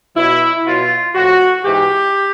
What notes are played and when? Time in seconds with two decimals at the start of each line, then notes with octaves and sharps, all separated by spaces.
0.16 B2 F#3 E4
0.65 B2 F#3 F4
1.15 A2 F3 F#4
1.64 G#2 E3 G4